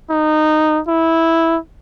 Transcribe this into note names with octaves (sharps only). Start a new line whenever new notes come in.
D#4
E4